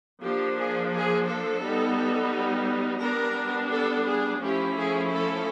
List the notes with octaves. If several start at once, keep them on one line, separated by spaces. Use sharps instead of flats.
F3 A#3 D4 G4
G#4
G#4
A4
G3 B3 D#4
G3 B3 D4 A#4
A4
G#4
F3 A3 C#4 E4 G4
G#4
A4